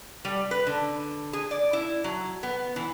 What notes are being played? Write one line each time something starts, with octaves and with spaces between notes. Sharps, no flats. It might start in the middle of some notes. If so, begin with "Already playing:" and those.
G3
B4
D3
G#4
D5
E4
F#3
B3
E3